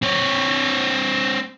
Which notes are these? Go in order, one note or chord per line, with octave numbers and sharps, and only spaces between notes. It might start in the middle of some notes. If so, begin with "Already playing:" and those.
C4 C#5